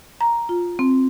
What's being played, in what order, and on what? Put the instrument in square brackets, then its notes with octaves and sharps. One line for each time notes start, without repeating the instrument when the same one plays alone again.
[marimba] A#5
F4
C4